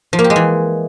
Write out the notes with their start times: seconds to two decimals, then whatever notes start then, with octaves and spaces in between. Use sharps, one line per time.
0.13 F3
0.19 A#3
0.24 G4
0.30 G#3
0.36 E3